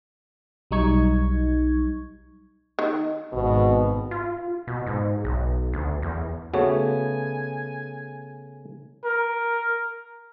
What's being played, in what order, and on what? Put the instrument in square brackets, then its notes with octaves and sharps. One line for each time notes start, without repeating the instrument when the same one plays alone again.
[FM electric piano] B1 F#3 G3 D#4 C#6 G#6
[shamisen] D#3
[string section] G#1 [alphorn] B2
[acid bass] F4
B2
G#2
B1
D2
E2
[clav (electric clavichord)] C#3 A3 B3 [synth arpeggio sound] F#4 C#5 [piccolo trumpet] G#5
[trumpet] A#4